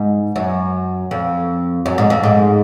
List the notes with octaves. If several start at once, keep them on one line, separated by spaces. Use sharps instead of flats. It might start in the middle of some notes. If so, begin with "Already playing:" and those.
Already playing: G#2
F#2
F2
F#2
G#2
F2
G#2